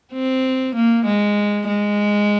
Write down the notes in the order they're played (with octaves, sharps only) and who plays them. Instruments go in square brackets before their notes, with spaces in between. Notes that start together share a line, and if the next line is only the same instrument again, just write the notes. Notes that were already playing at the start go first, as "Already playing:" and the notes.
[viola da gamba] C4
A#3
G#3
G#3